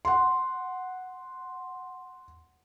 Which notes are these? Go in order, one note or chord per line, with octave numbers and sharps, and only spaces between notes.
F#5 C6